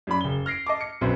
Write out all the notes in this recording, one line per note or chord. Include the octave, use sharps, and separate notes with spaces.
F#2 F#3 D5 B5
F#1 G7
F6 A#6 C7 D7
D#5 A5 D6
C#7
B1 F#2 B3 C4 C6